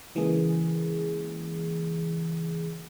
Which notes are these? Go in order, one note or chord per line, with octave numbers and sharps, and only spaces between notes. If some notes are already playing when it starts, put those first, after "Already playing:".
C#3 E3 G#3 A#3 G#4